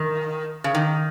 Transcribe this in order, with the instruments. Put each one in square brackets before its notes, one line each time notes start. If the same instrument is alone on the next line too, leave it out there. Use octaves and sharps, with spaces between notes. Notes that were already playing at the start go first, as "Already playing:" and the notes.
Already playing: [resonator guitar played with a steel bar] D#3
C#3
D#3